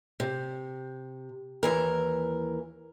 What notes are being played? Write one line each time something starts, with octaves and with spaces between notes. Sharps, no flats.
C3
D#2 E3 A#4